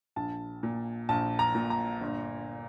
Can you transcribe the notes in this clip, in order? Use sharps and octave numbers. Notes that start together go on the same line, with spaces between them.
A#1 A5
A#2
A#1 A5
A#5
A#2
A#5
G1